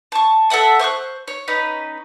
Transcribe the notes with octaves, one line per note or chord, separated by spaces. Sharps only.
A5 C#6
A4 E5 F#5 A5
C5 C#6 D#6 F#6
C#5
C#4 D#4 B4